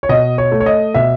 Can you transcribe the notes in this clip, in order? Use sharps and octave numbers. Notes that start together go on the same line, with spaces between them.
C#5
B2 D#5
C#5
A3
C#5
D#5
B2 E5